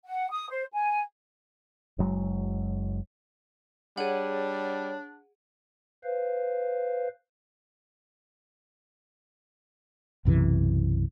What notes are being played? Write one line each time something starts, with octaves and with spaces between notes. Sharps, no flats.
F#5
D#6
C5
G#5
F#1 F#3 G#3
G3 D4 G#4 C#5 F#5
B4 C5 F5
B1 F#2 C3 E3